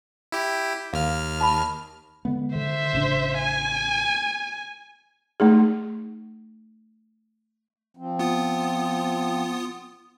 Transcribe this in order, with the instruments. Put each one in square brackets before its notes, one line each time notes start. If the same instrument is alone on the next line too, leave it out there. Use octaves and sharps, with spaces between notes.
[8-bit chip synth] E4 G4
[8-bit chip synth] D#2 F6 [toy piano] F5
[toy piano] A5 B5
[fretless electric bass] D3 G#3 B3
[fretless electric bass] D3 [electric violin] C5 E5
[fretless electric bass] A1 C#3 D4
[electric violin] G#5
[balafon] A3 D#4 G#4
[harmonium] F3 C4
[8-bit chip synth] B3 F4 D#6